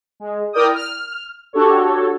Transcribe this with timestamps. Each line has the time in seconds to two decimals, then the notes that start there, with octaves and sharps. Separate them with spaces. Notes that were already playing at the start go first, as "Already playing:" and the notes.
0.20 G#3
0.53 E4 A#4 D5 G5 D#6
0.74 F6
1.53 D4 F#4 G4 A4 C#5